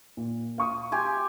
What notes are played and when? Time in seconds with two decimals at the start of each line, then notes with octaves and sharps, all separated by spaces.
0.17 A#2
0.58 F5 C#6 D#6
0.92 G4 G#5 C6